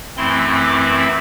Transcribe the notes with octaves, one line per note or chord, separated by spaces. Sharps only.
F#2 E3 A3 C4 E4 C6
D6